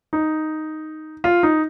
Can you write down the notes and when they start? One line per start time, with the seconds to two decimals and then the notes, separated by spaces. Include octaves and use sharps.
0.13 D#4
1.24 F4
1.43 D#4